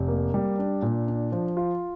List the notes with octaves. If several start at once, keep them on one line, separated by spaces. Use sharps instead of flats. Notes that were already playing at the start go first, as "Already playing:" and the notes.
Already playing: F1
A#3
G3
D4
A#2
D4
F3
F4